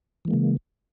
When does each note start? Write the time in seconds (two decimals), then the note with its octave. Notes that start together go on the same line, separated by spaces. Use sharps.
0.25 E3
0.28 G#3
0.31 A#3
0.33 C#3